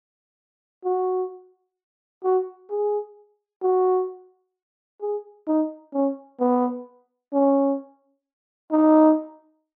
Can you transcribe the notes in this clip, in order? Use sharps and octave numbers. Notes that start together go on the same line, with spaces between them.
F#4
F#4
G#4
F#4
G#4
D#4
C#4
B3
C#4
D#4